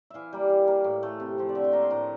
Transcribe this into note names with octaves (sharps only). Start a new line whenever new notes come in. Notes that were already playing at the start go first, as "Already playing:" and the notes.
E3 E5 F5
G3 A#3
E3
A#3
A2
E3 A3
C3
F3 C4
D5
D3 E5
G5
F3 A#3 A#5
C6
A2 A#5